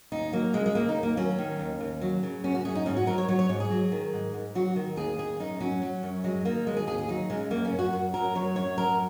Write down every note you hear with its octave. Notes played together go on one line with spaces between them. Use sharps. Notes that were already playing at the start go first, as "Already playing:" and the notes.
D#2 D#4
F#3 A#3
C#3 G#3
G#3
D#2 A#3
D#4
D#2
A#3
F#3 C#4
D#3
D#2
D#2
F#3
C#3
F#2 C#4
F#4
F#2 G#4
D#4
G#2 C#4
F#4
F#3 A#4
C#5
F#3 C#5
C#5
G#2 C#5
G#4
F#3
D#3
G#2
G#2
F#3 F#4
D#3
D#2 G#4
D#2 G#4
F#2 D#4
F#3 C#4
F#3
F#2
F#3 G#3
D#3 A#3
D#2 G#3
G#4
D#2 G#4
G#4
F#3 D#4
C#3 G#3
F#2 A#3
C#4
F#2
F#4
F#2
F#3 A#4
F#3 C#5
F#2 C#5
F#3 A#4